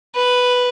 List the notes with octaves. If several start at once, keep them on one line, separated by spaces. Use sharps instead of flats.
B4